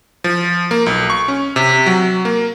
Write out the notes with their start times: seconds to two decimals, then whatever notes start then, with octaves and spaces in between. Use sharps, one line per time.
0.24 F3
0.71 A#3
0.86 B1
1.10 C#6
1.28 C#4
1.56 C3
1.86 F#3
2.25 A#3